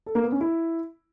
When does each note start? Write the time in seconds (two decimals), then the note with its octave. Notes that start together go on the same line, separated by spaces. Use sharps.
0.06 A4
0.15 A#3
0.24 B3
0.32 C#4
0.41 E4